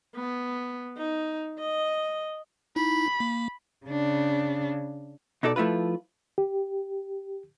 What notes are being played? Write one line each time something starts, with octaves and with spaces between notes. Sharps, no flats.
B3
D#4
D#5
D#4 E4 B5
A#3
C#3 D4
B2 D#4 A4 D5
F3 A3 E4 F4 B4
G4